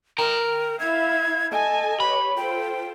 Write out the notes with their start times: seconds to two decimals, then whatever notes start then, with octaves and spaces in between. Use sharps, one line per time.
0.19 A#4 G5 A#5
0.80 E4 E5 F5 G#6
1.52 A4 D#5 G#5 A5
2.00 G4 B4 C#5 B5
2.37 F4 A4 C5 G5